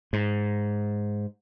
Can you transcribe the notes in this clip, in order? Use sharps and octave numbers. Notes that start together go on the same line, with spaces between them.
G#2